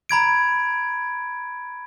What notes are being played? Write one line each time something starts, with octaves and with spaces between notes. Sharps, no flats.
A#5 B5 G#6 D7